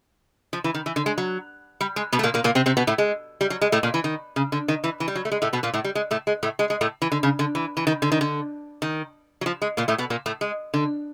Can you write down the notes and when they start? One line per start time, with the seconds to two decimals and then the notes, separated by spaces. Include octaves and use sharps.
0.53 F3
0.64 E3
0.74 D#3
0.86 E3
0.96 D3
1.06 G#3
1.18 F#3
1.81 G3
1.96 G#3
2.12 B2 B3
2.19 A3
2.23 A#2 A#3
2.34 A#2 A#3
2.44 A#2 A#3
2.55 C3 C4
2.66 C3 C4
2.77 B2 B3
2.87 A2 A3
2.98 G#3
3.41 G3
3.50 F#3
3.61 G#3
3.72 A2 A3
3.83 A#2 A#3
3.94 E3
4.04 D#3
4.36 C#3
4.52 D3
4.68 D#3
4.84 E3
5.00 E3
5.08 G3
5.15 F#3
5.25 A3
5.32 G#3
5.42 A2 A3
5.53 B2 B3
5.63 A#2 A#3
5.74 A2 A3
5.84 G3
5.95 G#3
6.11 A2 A3
6.27 G#3
6.43 A2 A3
6.59 G#3
6.70 G#3
6.81 A2 A3
7.02 E3
7.12 D3
7.23 C#3
7.39 D3
7.55 E3
7.77 E3
7.87 D#3
8.02 D3
8.12 D#3
8.21 D3
8.82 D#3
9.41 F#3
9.46 F3
9.62 G#3
9.77 A#2 A#3
9.88 A2 A3
9.98 B2 B3
10.10 A#2 A#3
10.26 A2 A3
10.41 G#3
10.74 D3